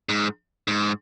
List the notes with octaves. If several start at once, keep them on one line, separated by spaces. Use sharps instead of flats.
G#2
G#2